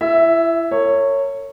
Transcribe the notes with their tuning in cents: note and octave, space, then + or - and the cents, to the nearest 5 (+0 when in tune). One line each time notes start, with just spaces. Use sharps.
E4 +30 E5 +0
A#4 -45 C#5 -5